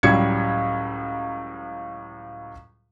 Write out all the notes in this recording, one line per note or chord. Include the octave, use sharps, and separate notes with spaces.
C#2 A2 F#3 G3 G#6 C#7